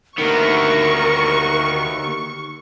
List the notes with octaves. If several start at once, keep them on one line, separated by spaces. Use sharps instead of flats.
D2 D#3 A#3 B3 A#4 C#6